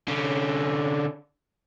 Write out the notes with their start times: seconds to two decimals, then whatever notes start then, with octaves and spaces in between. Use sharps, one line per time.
0.08 D3 C#4